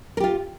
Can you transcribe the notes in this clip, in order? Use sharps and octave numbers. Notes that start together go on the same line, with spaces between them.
F4 G4 A#4